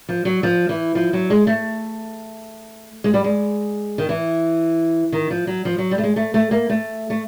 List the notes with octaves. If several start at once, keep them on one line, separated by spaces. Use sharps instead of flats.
F3
F#3
F3
E3
F3
F#3
G#3
A3
G#3
G3
G#3
D#3
E3
D#3
F3
F#3
F3
F#3
G3
A3
G#3
A3
A3
A#3
A3
A3